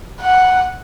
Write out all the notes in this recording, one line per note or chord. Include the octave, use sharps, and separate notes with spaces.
F#5